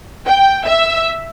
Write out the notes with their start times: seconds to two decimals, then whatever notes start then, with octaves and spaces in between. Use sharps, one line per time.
0.27 G5
0.66 E5